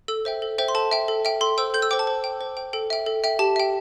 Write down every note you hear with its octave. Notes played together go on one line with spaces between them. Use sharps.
A4 E6
C5 E5 G5
A4
C5 E5 G5
C6
A4 A5
E5 G5
A4
E5 G5
A4 C6
C5 G5 E6
A4 G6
E6
C5 G5 D6
A5
C5
G5
C5
G5
A4 G5
E5 G5
A4
E5 G5
G4 A5
E5 G5